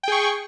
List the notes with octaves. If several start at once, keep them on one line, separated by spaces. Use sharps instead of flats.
G#4 G5 C#6